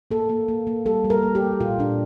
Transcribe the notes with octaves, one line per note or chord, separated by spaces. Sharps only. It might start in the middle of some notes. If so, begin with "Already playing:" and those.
A#3 A4
A#3
A#3
A#3
G3 A4
G3
A#4
A#3
G4
A#3
A#2 F4
A#2 D4